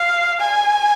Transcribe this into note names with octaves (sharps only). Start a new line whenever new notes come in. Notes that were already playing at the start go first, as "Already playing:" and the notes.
Already playing: F5
G#5